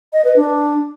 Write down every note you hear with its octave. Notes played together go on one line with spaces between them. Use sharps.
D#5
B4
D4